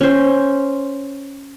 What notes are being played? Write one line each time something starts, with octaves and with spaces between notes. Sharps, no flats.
C#4 C5